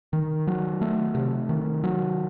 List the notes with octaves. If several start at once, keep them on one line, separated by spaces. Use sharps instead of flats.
D#3
F#3
A3
C3
D#3
F#3